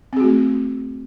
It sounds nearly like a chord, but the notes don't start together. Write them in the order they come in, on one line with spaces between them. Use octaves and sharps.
C4 G#4 F#4 A3